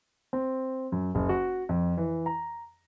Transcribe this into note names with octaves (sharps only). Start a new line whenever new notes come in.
C4
F#2
F#1
F#4
F2
E3
A#5